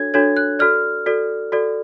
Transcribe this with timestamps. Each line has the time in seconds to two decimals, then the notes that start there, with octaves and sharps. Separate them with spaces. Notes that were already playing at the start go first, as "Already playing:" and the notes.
Already playing: D4 F#4 A4 C#5 G#6
0.14 D4 F#4 A4 C#5 G#6
0.37 F#6
0.59 F#4 A4 D5 F6
1.06 F#4 A4 D5
1.52 F#4 A4 D5